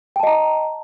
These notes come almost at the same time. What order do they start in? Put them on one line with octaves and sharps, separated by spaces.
G5 A5 D#5 A#5